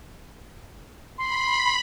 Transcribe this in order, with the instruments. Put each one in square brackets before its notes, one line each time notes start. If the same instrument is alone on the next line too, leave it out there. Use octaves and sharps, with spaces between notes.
[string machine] B5 [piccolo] C6